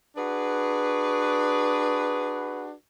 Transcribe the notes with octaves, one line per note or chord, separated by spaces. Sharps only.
D4 F#4 G#4 B4